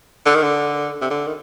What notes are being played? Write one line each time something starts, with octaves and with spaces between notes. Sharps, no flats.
D3
D#3
D3
C3
D3
D#3